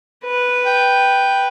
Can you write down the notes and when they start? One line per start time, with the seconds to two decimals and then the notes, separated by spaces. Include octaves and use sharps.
0.25 B4
0.65 G5